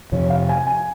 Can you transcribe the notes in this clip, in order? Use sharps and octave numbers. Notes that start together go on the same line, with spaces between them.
F2 C3 F3 C#5
F5
G#5
G#5